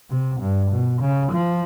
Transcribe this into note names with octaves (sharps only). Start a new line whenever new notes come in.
C3
G2
B2
C#3
F3